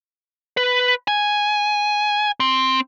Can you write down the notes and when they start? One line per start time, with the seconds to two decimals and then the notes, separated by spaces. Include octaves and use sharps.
0.57 B4
1.08 G#5
2.40 C4